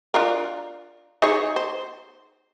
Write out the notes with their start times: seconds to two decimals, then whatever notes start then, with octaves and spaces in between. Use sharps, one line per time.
0.14 D4 F4 A#4
1.22 D#4 G#4 C#5
1.56 C5